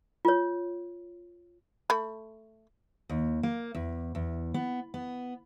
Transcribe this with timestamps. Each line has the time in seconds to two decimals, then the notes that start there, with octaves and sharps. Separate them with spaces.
0.25 F4 C#5
1.90 A3 B5
3.09 D#2
3.43 A#3
3.75 E2
4.15 E2
4.54 B3
4.94 B3